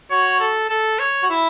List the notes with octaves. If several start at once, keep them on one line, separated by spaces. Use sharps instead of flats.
F#4 C#5
A4
A4
C#5
F#4
E4